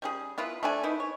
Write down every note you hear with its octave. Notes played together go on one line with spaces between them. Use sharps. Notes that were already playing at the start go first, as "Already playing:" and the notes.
G3 C#4 G#4
B3 E4 F4 B4
A3 D4 D5 G#5
D#4 E4 B4
C#5